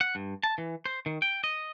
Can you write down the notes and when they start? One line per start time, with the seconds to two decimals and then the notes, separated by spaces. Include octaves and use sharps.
0.01 F#5
0.15 G2
0.43 A5
0.58 E3
0.86 C5
1.06 D#3
1.22 G5
1.44 D#5